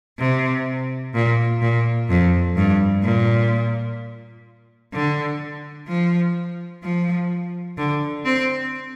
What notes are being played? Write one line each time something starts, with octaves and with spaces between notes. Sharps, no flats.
C3
A#2
A#2
F2
G2
A#2
D3
F3
F3
D3
C4